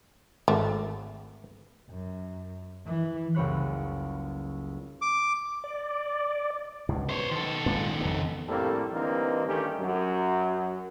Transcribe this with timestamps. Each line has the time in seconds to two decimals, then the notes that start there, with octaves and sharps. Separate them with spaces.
0.48 G#1 A3
1.90 F#2
2.87 E3
3.35 F#1 C#2 G3 C#5 B5 F#6
5.02 D6
5.64 D5
6.89 C#2 G2 B2
7.09 B2 C5 C#5
7.31 D#3 A4
7.66 A#2 G#3 B3
8.01 F2 C#3 B3
8.48 A#1 A2 G3 A#3 C4 A4
8.93 D3 E3 G3 A#3 C4 D#4
9.47 G2 D#3 A3 C#4 G4
9.80 F#2 F#3